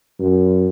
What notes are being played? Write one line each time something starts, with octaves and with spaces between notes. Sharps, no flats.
F#2